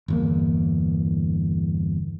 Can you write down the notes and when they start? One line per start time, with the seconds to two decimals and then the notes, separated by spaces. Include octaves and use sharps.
0.08 G1 E2 A#3